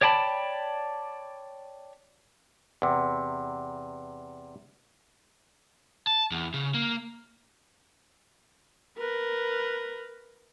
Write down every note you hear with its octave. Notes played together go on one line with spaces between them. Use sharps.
C#5 D5 G5 A5 B5
E2 C3
A5
E2
C#3
A#3
A#4 B4